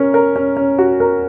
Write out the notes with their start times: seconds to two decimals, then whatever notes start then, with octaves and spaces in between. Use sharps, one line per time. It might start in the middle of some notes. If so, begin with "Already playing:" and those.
Already playing: C#4 A#4
0.14 A#4
0.36 C#4
0.57 C#4
0.78 F#4
1.00 A#4